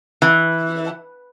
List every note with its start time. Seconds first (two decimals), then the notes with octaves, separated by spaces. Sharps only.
0.22 E3